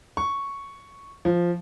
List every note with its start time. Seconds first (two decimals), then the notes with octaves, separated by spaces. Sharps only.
0.17 C#6
1.25 F3